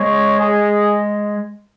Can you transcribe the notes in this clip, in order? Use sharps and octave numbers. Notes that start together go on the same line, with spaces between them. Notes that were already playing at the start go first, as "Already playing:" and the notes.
Already playing: G#3 C#5
G#4